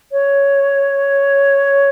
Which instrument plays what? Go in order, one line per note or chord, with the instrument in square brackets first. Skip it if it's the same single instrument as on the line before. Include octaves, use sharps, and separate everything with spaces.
[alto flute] C#5